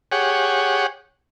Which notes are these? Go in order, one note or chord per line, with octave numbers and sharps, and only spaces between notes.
G4 G#4 C#5 F#5